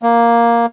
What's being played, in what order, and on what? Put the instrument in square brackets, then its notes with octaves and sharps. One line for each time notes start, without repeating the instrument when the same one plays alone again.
[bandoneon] A#3